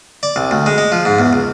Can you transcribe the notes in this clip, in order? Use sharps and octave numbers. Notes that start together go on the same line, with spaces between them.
D5
C2
D2
G#3
G#3
F3
G#2
E2
C#2